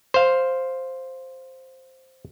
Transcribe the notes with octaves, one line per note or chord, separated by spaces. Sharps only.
C5 F5